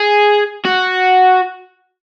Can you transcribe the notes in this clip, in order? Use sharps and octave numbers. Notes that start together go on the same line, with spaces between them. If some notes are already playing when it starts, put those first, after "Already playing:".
Already playing: G#4
F#4